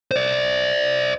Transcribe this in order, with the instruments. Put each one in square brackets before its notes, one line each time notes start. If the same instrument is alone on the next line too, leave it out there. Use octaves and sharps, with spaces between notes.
[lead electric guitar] C5 D5